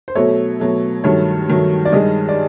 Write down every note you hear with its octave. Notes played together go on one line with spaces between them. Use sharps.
C5
B2 F#3 A3 C#5
B2 F#3 A3
G2 D#3 F#3 A3 C#5
G2 D#3 F#3 A3
D5
G2 D#3 G#3 D#5
D5